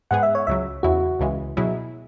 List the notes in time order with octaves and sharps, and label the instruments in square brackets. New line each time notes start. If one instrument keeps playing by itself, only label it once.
[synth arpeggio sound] G#2 G#3 B3 G#4 [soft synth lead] F#5
[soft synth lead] E5
C#5
[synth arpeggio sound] C#2 C#3 F#3 [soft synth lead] E5
[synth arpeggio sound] E2 C#3 F#3 E4 [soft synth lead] F#4
[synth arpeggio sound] C#2 C#3 E3 G#3
B2 F#3 E4 G#4